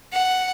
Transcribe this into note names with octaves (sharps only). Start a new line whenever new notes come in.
F#5